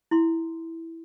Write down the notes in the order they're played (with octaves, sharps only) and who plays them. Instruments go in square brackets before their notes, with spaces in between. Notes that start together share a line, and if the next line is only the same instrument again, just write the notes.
[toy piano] E4 C6